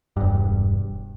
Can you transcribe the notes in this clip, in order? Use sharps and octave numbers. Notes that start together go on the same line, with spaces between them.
E1 G2